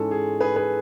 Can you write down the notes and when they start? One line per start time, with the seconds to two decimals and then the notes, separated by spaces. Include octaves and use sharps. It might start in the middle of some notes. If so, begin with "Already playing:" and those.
Already playing: G#2 E3 G#3 C#4 A4
0.11 G#4
0.41 G#4 B4
0.56 G#4 B4